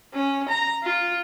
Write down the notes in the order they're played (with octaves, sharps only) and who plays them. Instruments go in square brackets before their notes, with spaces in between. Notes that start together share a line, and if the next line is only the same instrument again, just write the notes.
[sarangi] C#4
A#5
F4